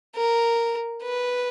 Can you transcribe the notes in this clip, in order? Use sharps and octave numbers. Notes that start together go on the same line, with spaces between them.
A#4
B4